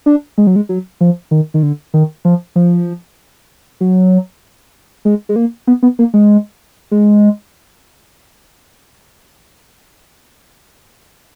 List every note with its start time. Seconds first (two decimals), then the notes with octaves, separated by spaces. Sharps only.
0.06 D4
0.38 G#3
0.47 F#3
0.56 G#3
0.69 F#3
1.01 F3
1.31 D#3
1.54 D#3
1.63 D3
1.94 D#3
2.25 F3
2.56 F3
3.81 F#3
5.05 G#3
5.29 G#3
5.36 A#3
5.67 B3
5.83 B3
5.99 A#3
6.14 G#3
6.91 G#3